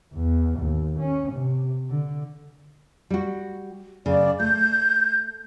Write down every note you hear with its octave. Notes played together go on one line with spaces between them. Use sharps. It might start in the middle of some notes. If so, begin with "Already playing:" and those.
E2
D#2
C#4
C3
D3
G3 F#4
F#2 C#3 D5
A3 G6